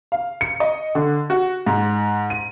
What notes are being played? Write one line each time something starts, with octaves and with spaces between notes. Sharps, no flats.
F5
C#7
D#5
D3
F#4
G#2
D#7